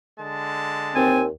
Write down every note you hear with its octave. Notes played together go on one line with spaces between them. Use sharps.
D3 G#3 A5
D#2 C4 G#5